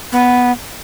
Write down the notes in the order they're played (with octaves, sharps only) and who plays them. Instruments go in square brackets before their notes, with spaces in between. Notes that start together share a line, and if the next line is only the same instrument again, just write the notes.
[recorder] B3